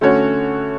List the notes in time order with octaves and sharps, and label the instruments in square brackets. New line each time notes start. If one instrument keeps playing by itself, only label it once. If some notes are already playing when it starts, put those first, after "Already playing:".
[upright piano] D3 A3 C#4 F#4 C#5